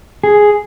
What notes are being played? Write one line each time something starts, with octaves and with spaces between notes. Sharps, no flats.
G#4